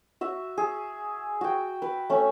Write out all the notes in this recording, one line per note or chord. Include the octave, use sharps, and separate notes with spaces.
F#4 E5
G#4
F#4 G5
B4
A3 C#4